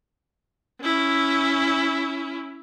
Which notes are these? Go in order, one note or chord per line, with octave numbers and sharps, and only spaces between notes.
C#4 E4